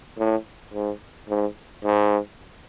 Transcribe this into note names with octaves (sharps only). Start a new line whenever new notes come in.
A2
G#2
G#2
G#2